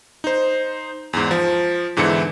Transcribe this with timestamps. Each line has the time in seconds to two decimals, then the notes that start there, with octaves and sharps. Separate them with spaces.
0.24 D#4 C5
1.13 E2 G#2
1.31 F3
1.96 E2 G#2 D3 E3 E4 C#7